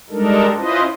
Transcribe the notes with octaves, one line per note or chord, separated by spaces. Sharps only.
G3 G#3 D4 D#4 A4 A#4
C#4 E4 F4 B4 C5 D#5